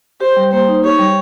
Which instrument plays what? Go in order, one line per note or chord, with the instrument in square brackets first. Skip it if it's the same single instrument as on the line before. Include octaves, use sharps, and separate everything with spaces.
[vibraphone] G4 [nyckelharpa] C5
[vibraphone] G3
[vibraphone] A#3 [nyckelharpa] C5
[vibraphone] D#4
[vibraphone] G4 [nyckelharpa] C#5
[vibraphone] G3